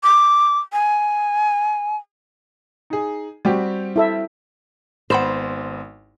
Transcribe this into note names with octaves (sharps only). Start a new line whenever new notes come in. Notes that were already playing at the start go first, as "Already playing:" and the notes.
D6
G#5
D#4 G#4
G3 C4 F#4 G4
E4 A4 E5
G#1 B3 C5 F#5 B5 E7